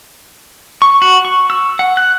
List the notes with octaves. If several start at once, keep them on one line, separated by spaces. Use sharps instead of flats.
C#6
F#4
C#6
E6
F#5
F#6